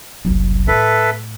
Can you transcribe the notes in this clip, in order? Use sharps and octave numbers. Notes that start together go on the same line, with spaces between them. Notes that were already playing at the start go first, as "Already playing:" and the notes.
F#1 C2
A2 A4 B4 E5